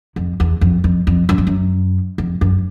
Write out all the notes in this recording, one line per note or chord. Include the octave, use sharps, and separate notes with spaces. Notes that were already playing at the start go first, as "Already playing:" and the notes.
F2
E2
F2
F2
F2
F#2
F2
F#2
F2
F#2